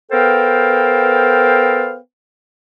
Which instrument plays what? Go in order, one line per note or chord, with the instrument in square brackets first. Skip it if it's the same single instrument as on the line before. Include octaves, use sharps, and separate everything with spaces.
[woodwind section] B3 A4 A#4 C5 F5 G5